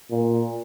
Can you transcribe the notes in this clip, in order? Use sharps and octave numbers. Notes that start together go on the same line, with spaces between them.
A#2